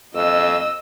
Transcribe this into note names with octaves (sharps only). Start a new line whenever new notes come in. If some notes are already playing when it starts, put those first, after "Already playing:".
F2 D#5 E6